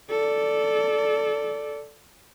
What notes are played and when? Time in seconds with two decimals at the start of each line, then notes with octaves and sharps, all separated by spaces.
0.10 A4 D5